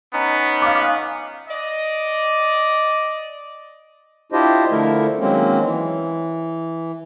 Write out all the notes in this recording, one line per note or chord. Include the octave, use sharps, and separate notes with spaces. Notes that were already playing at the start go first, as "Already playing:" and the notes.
B3 C#4 D#4
F5 D6
D5 D#5
D4 E4 F4 G4 C5 D#5
D3 F3 A3 E4 A#4
D#3 F#3 G#3 A#3 C4 C#4
E3